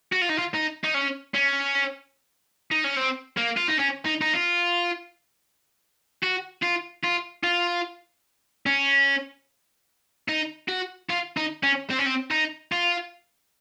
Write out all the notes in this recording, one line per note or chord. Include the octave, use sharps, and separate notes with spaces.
F#4
F4
D#4
F4
D#4
D#4
C#4
C#4
D#4
C#4
C4
A#3
F4
D#4
C#4
D#4
D#4
F4
F#4
F4
F4
F4
C#4
D#4
F#4
F4
D#4
C#4
C4
C#4
C4
D#4
F4